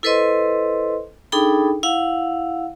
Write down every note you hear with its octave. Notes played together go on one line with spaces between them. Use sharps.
E4 A4 B4 C5 D#5 C6
D4 D#4 G#4 A4 G5 B5
E4 F5 F#5